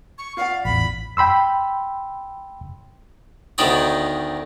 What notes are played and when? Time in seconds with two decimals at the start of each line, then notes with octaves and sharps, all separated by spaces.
0.18 C#6
0.37 F4 D5 F5 F#5
0.65 A1 E2 B5 B6
1.17 G5 B5 C6 E6
3.58 D2 D#3 B3 D#4 C#5 D5